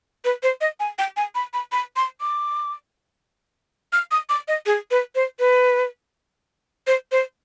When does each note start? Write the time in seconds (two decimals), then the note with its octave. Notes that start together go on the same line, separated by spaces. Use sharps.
0.25 B4
0.43 C5
0.61 D#5
0.80 G#5
0.98 G5
1.17 G#5
1.35 B5
1.54 B5
1.72 B5
1.96 C6
2.21 D6
3.93 F6
4.11 D#6
4.29 D6
4.48 D#5
4.66 G#4
4.91 B4
5.15 C5
5.40 B4
6.87 C5
7.12 C5